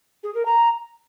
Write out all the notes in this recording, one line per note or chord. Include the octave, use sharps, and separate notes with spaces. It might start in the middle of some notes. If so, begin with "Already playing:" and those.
G#4
A#4
A#5